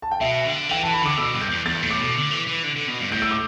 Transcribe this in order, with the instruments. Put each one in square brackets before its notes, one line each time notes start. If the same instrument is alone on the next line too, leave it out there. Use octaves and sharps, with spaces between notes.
[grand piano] A5
G5
[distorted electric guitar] B2 [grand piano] E5
[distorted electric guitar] D3
[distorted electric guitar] E3 [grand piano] G5
[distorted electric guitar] E3 [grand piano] A5
[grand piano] B5
[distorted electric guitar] D3 [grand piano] D6
[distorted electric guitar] B2 [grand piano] E6
[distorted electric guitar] G2
[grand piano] G6
[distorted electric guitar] E2
[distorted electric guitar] E2 [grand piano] A6
[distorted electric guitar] A2
[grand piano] D6
[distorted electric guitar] B2
D3
E3
E3
D3
D3
B2
G2
[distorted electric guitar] A2 [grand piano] G6
[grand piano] E6
D6